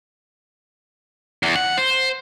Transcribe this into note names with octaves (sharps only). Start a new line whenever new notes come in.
E2
F#5
C5